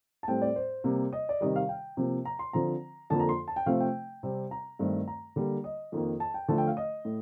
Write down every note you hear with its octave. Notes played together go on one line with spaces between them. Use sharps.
A5
A2 G3 C4 G5
D5
C5
C3 G3 A#3
D#5
D5
C3 D#3 G3 D#5
F5
G5
C3 F3 A#3
A#5
C6
D3 F3 C4 A#5
F2 D3 F3 A#3 A5
A#5
C6
A5
G5
C3 F3 A3 C4 F5
G5
C3 G3 C4
A#5
G2 D#3 A3 C4
A#5
D3 G3 A#3
D#5
F2 D#3 A#3
A5
G5
D3 F3 A3 A5
G5
F5
D#5
A2